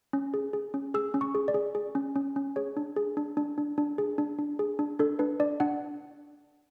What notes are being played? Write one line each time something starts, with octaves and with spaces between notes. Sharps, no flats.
C#4
G#4
G#4
C#4
G#4 E6
C#4
C#6
G#4
D5
G#4
G#4
C#4
C#4
C#4
G#4 C#5
D4
G#4
D4
D4
D4
D4
G#4
D4
D4
G#4
D4
D4 A4
D4 B4
D4 D5
D4 F#5